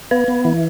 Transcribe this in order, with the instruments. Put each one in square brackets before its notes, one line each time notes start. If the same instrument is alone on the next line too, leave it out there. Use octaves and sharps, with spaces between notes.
[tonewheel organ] B3 [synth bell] B4
[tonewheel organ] B3
E3